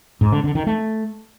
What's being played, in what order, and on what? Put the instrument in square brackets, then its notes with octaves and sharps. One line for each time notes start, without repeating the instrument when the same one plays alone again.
[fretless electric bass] G#2
D3
D3
D#3
A3